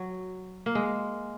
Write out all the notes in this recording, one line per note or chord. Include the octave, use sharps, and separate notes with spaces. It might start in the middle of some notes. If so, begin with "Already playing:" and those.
Already playing: F#3
A#3
G#3